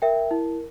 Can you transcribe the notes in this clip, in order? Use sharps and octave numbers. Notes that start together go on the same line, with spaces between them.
A#4 E5 G5
E4